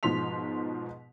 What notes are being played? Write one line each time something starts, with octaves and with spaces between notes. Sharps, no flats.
G#2 B2 F3 C6 B6 F7